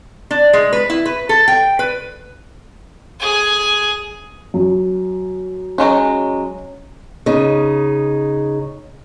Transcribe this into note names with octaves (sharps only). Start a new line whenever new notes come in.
D4
G#3
B4
E4
B4
A4
G5
B4
G#4 G#5
F#2
F#3 G#3 C#4 F#4
C#3 D#4